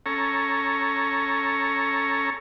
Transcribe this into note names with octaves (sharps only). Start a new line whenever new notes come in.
C#4 A4 C#5 A#5